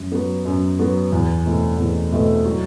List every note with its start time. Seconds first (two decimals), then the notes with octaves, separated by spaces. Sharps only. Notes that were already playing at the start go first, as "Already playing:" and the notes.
Already playing: F#2
0.12 F#3 B3
0.45 F#2
0.79 F#3 B3
1.12 E2
1.46 B2 A3 C4 E4
1.78 E2
2.12 B2 A3 C4 E4
2.45 F#3